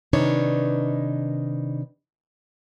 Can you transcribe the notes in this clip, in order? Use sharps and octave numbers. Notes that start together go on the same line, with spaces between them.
C3 D#3 D4 D#4 B4 C#5